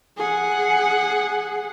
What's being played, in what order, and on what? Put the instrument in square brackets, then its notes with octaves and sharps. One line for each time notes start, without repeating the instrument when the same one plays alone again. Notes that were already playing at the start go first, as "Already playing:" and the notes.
[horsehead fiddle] G#4 F#5